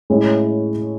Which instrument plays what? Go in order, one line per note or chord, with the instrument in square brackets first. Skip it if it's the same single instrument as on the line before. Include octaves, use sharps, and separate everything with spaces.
[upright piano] A2 G#3 C#4 E4